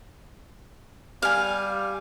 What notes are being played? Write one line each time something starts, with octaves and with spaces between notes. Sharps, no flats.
G3 F5 G#5